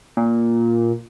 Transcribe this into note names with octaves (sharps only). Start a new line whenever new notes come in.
A#2